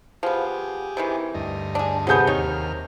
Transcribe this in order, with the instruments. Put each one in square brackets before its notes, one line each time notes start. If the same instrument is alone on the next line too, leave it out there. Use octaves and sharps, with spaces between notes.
[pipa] F3 B3 [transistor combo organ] G4 G#4
[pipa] C3 D#3 E3
[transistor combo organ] D2 G2 D#5
[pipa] D4 G#4
[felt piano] C3 G#4 G6 [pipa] F#3 A3 B3
[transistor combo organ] D#2 F6 [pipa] D#3 D#4 C#5